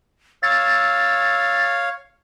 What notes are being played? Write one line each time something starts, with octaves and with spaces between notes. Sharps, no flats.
C#5 F5 E6 A6